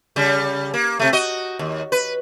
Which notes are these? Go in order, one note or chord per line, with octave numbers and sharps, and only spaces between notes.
C#3 G3
A#3
C3 A3
F#4 D#5
D#2
B4